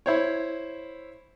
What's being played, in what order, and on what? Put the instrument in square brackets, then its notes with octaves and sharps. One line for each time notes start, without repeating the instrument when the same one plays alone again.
[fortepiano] E4 C5 C#5